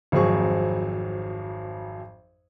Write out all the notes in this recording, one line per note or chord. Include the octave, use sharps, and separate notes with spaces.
G#1 F2 F#3 G#4 C#6